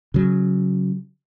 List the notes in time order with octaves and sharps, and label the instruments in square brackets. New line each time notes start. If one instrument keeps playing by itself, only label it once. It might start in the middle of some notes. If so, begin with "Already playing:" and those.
[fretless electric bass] C#3 F#3